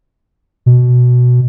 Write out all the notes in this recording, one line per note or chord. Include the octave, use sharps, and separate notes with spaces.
B2